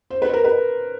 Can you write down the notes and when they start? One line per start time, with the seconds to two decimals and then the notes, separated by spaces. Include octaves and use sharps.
0.10 C5
0.22 B4
0.34 A#4
0.44 B4